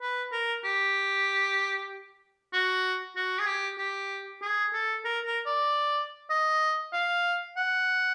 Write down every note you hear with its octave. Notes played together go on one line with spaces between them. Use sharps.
B4
A#4
G4
F#4
F#4
G#4
G4
G4
G#4
A4
A#4
A#4
D5
D#5
F5
F#5